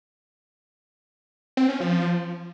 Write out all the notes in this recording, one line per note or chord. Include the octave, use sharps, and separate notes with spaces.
C4
C#4
F3